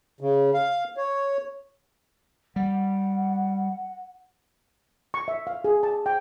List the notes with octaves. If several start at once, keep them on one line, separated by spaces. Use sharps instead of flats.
C#3
F5
C#5
G3 F#5
C#6
E5
F5
G#4
A5
G5